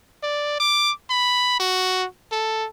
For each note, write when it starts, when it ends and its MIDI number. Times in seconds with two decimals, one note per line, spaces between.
0.23 0.59 74
0.60 0.92 86
1.10 1.58 83
1.60 2.06 66
2.32 2.67 69